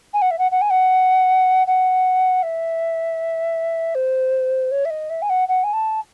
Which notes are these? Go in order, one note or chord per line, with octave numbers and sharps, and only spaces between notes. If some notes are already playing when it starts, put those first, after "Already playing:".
G#5
F#5
E5
F#5
F#5
G#5
F#5
F#5
E5
C5
C#5
E5
D#5
E5
G#5
F#5
F#5
G#5
A5